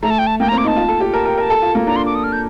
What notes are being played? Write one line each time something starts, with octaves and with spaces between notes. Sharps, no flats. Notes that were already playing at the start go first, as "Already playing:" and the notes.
A3 A#5
A5
G5
A5
A#3 G5
A#5
C4
D6
D#4 A5
F4
A4
G4
A#4 A5
A#4 G5
A#4 A5
A4
F4
A#3
D4 A#5
C6
D6
D#6
F6
G6